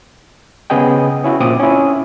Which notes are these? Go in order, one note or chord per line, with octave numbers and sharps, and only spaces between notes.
C#3 B3 G#4 D#5 G5
C#4 E4 F#4
A#2 C4 D6 D#6
C#4 E4